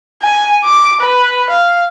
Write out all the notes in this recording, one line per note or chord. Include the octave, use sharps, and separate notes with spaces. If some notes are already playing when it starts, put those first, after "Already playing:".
G#5
D6
B4
F5